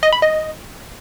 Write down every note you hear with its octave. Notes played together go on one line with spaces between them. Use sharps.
D#5
B5
D#5